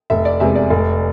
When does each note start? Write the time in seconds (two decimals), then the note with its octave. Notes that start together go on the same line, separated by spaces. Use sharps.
0.10 F1 E5
0.25 D5
0.40 E2 C3 G#3 E5
0.55 D5
0.70 F1